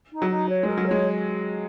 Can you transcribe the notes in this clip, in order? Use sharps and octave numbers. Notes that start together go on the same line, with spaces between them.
D#4
F#3
D#4
C#5
G#3 A#4
F#3
G#3 C#5